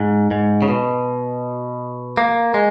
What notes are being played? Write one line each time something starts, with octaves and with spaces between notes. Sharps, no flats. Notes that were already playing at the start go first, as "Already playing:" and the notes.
Already playing: G#2
G#2
C#3
B2
A#3
G#3